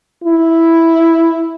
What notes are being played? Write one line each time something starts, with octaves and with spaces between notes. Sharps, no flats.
E4